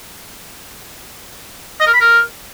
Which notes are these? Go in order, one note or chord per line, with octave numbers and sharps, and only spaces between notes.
D#5
A#4
B5
A#4